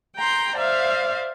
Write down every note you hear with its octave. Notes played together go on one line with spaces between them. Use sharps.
G5 A#5 C6
C5 D5 E5 F5